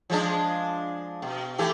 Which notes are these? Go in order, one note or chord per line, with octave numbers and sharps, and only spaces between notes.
F3 G#3 D4
B2
E3 A3 G4